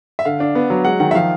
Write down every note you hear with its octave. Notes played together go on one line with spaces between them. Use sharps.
E5
D3 F5
D4
B3
F#3
G#3 F#5
D#3 F#5
E5
F3 F5